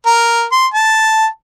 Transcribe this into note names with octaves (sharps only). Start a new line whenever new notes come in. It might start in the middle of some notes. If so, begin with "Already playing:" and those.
A#4
C6
A5